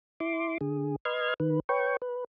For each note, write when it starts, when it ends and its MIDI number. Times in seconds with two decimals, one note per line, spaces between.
0.20 0.58 64
0.20 0.58 84
0.20 0.58 86
0.61 0.96 50
0.61 0.96 68
1.05 1.34 71
1.05 1.34 75
1.05 1.34 84
1.05 1.34 89
1.05 1.34 92
1.40 1.60 51
1.40 1.60 71
1.69 1.97 71
1.69 1.97 73
1.69 1.97 79
1.69 1.97 85
2.02 2.24 71